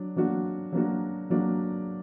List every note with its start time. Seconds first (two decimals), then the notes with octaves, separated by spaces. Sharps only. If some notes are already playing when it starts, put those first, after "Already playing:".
Already playing: F#3 D4
0.16 F#3 A#3 D4 F#4
0.73 F#3 A#3 D4 F#4
1.30 F#3 A#3 D4 F#4